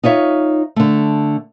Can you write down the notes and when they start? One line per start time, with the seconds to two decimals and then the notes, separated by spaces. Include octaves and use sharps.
0.03 D#4 F4 C#5 E5
0.76 D3 A3